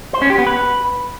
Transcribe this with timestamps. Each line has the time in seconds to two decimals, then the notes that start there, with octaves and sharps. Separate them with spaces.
0.13 C5
0.22 C#4
0.30 G4
0.38 B3
0.47 B4